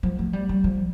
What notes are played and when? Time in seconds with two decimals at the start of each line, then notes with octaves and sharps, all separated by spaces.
0.03 F3
0.19 A3
0.33 G3
0.49 G3
0.64 F3